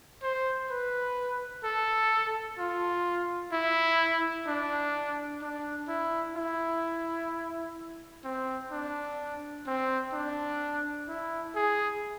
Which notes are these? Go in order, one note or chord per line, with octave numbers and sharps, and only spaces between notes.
C5
B4
A4
F4
E4
D4
D4
E4
E4
C4
D4
C4
D4
E4
G#4